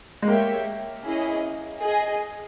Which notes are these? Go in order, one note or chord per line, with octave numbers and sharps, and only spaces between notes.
G#3
A#3 G4 C#5 E5 G5
C#4 E4 G#4 D#5
G#4 D#5 G#5